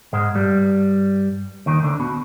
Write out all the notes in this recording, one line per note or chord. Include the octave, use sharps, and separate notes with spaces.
G#2 G#3
G2 G3
D#2 D#3
D2 D3
B2